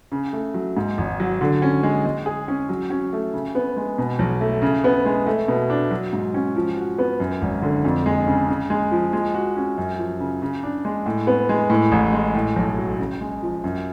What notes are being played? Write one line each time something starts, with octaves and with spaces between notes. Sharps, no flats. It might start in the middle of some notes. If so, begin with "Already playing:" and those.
C#3
A3
F#3
G#2
G#1
F#3
D3
C#4
G#3
G#3
G#4
C#4
F#3
C#4
A3
C#3
B3
G#3
B2
B1
A3
C#3
B3
G#3
A3
B2
D4
F#3
G#2
C#4
F3
F#4
B3
F#2
G#1
D3
F2
G#3
C#3
C#3
G#3
F3
G#3
F#4
C#4
F#2
F3
C#3
C#3
D4
G#3
A2
B3
G#3
A2
A1
G#3
A2
B1
F#3
C#3
G#3
F3
F#2